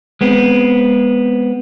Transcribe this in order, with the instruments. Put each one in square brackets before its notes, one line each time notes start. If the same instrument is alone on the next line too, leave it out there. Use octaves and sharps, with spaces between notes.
[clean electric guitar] G#3 B3 C4